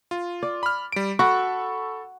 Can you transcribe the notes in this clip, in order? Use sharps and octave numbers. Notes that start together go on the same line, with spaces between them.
F4
D5
B5 F6
G3 D7
F#4 A4 B5 C#6